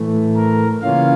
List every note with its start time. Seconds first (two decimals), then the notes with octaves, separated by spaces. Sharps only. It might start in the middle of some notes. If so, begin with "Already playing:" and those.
Already playing: A2 E3 A3
0.36 A#4
0.82 C#3 E3 A#3 C#4 F4 F5